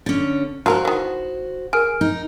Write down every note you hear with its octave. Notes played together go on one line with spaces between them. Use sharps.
D3 C#4
F#3 F4 F#4 A#4 C5
D#3 E3
G#4 A#4 F6 D7
D#4